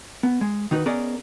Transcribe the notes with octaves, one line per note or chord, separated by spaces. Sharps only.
B3
G#3
D#3 D#4 F#4 B4
B3 C#4 G#4 A#4 D5 D#5